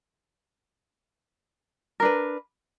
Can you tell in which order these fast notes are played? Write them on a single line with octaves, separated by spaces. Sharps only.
A#4 D4 B4